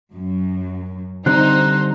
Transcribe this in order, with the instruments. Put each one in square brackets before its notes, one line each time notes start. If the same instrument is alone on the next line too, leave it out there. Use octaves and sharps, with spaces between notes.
[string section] F#2
[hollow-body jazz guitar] D3 G3 C4 [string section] D#4 C5 [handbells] F#6